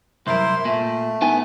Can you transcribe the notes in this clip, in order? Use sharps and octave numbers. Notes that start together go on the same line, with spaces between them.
C2 F#2 E4 A#4 C5 C6
A#2 A3
B3 D#4 G#5